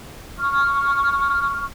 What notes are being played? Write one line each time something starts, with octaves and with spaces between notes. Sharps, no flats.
C#6 F6